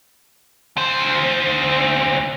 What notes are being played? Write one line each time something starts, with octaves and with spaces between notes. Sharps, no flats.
D2 C5